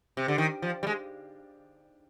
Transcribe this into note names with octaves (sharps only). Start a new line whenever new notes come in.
C3
D3
D#3
F3
G3
G#3